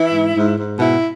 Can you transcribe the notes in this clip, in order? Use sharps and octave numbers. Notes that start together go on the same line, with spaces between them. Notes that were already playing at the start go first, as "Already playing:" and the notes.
Already playing: E3 E4
G#2
G#2
G#2
B2 E4